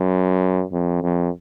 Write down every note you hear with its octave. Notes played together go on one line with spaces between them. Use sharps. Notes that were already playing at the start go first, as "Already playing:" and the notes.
Already playing: F#2
F2
F2